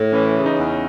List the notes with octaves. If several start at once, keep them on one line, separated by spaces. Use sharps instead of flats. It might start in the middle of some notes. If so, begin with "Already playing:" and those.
Already playing: A2
E3 C#4
C#3
D#4
E2